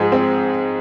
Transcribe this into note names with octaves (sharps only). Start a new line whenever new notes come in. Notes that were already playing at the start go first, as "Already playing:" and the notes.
Already playing: G#2 F3 G#3
C4